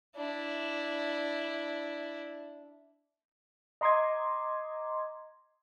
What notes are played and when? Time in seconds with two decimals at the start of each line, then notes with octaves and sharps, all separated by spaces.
0.16 D4 E4
3.81 D#5 A#5 C6 D6 D#6 G#6